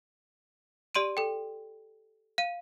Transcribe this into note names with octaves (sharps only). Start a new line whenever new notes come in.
G4 D5 C6 D7 D#7
A4 G5
F5 D#7